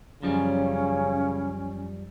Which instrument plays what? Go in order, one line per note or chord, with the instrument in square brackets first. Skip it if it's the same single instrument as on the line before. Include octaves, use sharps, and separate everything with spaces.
[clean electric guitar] F#2 F3 G3 [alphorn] C#3 [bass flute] C#4